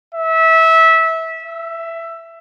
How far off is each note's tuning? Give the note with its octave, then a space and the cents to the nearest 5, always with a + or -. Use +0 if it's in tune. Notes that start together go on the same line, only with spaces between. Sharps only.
E5 -20
E5 +15